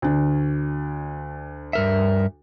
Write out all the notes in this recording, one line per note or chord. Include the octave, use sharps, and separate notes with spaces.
D2 D4
G2 A#4 E5